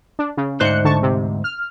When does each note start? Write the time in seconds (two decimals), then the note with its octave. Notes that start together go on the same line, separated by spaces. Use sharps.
0.19 D4
0.37 C#3
0.60 D2 G#2 C5 F#6 C#7
0.85 D3 A5 C#6
1.03 C3
1.44 F6